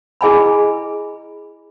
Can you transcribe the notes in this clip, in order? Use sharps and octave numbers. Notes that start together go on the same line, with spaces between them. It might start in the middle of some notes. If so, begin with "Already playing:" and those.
E4 G#4 D#5 G#5 A#5 B5